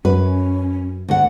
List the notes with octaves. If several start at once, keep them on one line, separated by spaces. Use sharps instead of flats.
F#2 C#4 B4
D2 F#5